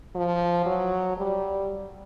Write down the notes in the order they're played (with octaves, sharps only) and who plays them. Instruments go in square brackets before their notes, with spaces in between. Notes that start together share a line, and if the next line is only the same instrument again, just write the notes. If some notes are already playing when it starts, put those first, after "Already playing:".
[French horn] F3
F#3
G3